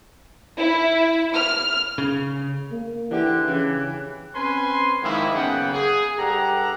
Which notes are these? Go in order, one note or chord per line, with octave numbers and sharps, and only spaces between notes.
E4
F6
C#3
A#3
D3 E3 G4
C#3 E3
C4 C#4 B4 G#5 C6
G#2 D#3 F3 G#3 A#3 E4
F#2 C#3 A#3 B3 F#5 G5
G#4
G2 G4 A4 F#5 A#5